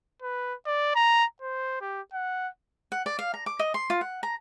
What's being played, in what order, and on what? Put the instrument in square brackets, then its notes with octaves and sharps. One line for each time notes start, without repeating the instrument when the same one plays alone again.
[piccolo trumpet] B4
D5
A#5
C5
G4
F#5
[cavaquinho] F#5
D5
F5
A#5
D6
D#5
C6
F4
F#5
A#5